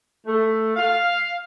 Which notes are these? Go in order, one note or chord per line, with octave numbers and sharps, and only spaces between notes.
A3
F5